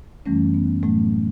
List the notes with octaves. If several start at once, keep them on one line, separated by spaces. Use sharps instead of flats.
F#2 E3 G3 A3 C#4
B3
A2 F#3 A3